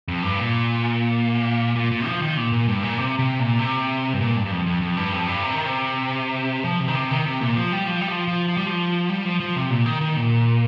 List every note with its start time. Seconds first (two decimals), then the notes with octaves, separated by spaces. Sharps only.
0.08 F2
0.23 G2
0.38 A#2
1.76 A#2
1.92 A#2
2.07 F3
2.22 D#3
2.37 A#2
2.52 A#2
2.68 G2
2.83 A#2
2.99 C3
3.19 C3
3.39 A#2
3.59 C3
4.14 G2
4.21 A#2
4.36 G2
4.46 G2
4.51 F2
4.66 F2
4.82 F2
4.97 G2
5.12 F2
5.27 G2
5.43 C3
5.54 D#3
5.66 C3
6.65 F3
6.80 C3
6.88 D#3
6.95 C3
7.11 D#3
7.26 C3
7.41 A#2
7.56 F3
7.72 G3
7.87 F3
8.01 G3
8.08 F3
8.28 F3
8.48 F3
8.57 G3
8.66 F3
9.10 G3
9.25 F3
9.40 F3
9.56 C3
9.70 A#2
9.86 D#3
10.01 D#3
10.16 A#2